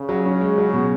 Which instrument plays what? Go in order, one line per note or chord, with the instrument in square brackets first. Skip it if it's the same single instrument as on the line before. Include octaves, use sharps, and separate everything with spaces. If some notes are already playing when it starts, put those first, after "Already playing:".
Already playing: [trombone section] C#3
[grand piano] F#3
C#4
G#3
F#3
B2